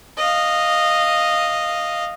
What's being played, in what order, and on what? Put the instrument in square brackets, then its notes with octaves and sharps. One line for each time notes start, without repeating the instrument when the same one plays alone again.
[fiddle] D#5 F5